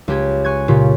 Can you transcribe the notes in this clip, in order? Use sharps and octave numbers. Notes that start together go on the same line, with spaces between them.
C#2 G4 G#6
G#5 C#6 F#6 G#6
A#2 C#3 F4 G4